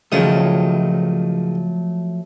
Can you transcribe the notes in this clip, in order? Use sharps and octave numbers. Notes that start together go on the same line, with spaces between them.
C#2 D#3 F3 F#3 A3 D#6